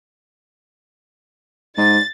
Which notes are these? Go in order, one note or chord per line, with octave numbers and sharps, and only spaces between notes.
G#2 A6